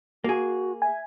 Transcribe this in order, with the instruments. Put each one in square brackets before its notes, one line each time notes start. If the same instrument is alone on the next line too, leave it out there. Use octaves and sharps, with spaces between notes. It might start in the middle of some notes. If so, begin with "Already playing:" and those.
[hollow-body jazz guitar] A#3 G#4 [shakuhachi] F#4
[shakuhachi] E5 [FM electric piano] G#5